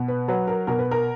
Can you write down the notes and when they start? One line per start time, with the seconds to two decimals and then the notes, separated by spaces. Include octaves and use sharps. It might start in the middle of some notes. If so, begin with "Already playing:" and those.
Already playing: B2
0.08 B4
0.28 F#3 B4
0.47 A#4
0.67 B2 A#4
0.79 B4
0.91 A#4